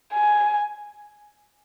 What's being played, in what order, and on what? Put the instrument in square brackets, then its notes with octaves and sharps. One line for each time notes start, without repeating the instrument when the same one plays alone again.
[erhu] G#5